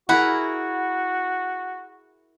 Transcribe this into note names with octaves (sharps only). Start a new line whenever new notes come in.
E4 F#4 G#4 A#4 F#5 B5